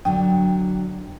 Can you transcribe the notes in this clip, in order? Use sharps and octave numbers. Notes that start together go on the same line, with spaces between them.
D3 F#3 D4 G5